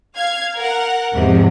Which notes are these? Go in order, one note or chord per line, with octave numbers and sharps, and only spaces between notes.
F5 G#6
A#4 F#5
E2 G#2 C3 F3